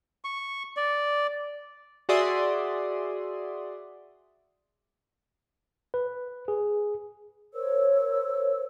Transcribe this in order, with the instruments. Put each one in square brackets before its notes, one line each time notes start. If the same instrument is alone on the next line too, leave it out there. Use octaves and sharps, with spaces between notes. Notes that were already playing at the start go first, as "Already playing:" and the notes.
[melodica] C#6
D5
[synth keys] F#4 G#4 D5 E5 C6 D#6
[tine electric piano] B4
G#4
[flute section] A#4 C5 C#5 E6